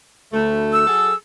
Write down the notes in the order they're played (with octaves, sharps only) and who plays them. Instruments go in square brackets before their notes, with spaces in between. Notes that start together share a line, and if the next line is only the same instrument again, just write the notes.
[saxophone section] D2 A3
[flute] E6
[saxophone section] F#3 G#4 A4